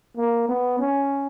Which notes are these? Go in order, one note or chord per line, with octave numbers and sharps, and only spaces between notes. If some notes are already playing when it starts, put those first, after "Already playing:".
A#3
B3
C#4